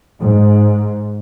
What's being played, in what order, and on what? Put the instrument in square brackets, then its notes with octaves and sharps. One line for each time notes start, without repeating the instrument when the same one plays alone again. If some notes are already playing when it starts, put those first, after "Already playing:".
[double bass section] G#2